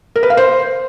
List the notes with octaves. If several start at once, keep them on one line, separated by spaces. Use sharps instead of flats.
A#4
B4
F5
C5